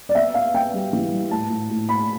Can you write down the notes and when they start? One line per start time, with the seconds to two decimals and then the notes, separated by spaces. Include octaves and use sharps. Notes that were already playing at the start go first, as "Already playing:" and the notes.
0.09 D5
0.15 B3 E5
0.34 B3 F5
0.54 B3 G5
0.74 G3
0.93 E3
1.12 G3
1.31 A2 A5
1.50 A2
1.70 A2
1.89 A2 B5